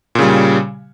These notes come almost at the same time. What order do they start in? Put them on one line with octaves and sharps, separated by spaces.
A#2 C#3 G3